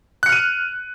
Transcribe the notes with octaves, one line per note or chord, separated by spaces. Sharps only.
F6 F#6 C#7 D#7